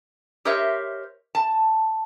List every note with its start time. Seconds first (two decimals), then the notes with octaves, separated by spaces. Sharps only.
0.45 G4 A#4 C5 C#5 D#5 E5
1.35 A5